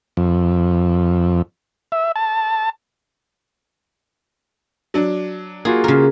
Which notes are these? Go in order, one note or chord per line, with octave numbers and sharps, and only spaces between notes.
F2
E5
A5
F#3 D4
A#3 F4 F#4 G#4
C#3 A#4